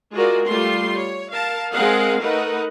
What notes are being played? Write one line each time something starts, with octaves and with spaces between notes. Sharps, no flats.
G#3 F4 F#4 A#4 D5
G3 A3 F4 C6
C#5
A#4 F5 A5
G#3 C4 G#4 A#4 F5 F#5
A3 D#4 A#4 B4 F#5